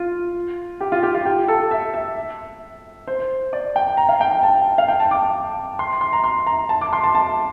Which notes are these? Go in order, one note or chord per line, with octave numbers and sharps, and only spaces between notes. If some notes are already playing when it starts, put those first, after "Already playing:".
Already playing: F4
G4
F4
G4
F4
G4
A4
E5
E5
C5
D5
G5
A#5
F5
G5
G5
A5
F5
G5
A5
D6
C6
C6
A#5
C6
A#5
A5
D6
C6
A5
A5